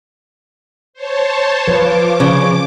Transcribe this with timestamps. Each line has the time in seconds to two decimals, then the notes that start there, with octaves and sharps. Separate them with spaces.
0.94 C5 C#5 A5
1.68 F3 B4 D6
2.20 C#3